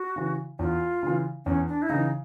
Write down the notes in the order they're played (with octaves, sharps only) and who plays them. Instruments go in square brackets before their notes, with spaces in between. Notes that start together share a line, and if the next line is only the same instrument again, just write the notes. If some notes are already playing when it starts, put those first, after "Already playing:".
Already playing: [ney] F#4
[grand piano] C#3 E3
[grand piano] E2 [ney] F4
[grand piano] C#3 E3
[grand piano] E2 [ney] C#4
[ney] D4
E4
[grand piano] C#3 E3 [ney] D#4